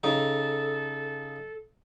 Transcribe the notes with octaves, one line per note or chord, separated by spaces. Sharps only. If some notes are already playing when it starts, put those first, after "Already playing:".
C#3 D#4 A4